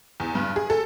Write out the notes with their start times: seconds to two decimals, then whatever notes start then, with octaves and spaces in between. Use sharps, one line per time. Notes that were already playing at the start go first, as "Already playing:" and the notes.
0.20 E2
0.35 G2
0.56 G#4
0.70 A4